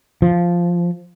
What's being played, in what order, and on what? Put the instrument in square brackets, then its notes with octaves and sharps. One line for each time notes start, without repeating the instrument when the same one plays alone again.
[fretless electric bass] F3